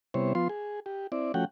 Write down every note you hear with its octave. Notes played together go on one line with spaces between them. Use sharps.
C3 G3 B3 E4 C5 C#5
F3 B3 F4 C6
G#4
G4
C4 E4 D5
F3 A3 C#4 F#4 F#5 G5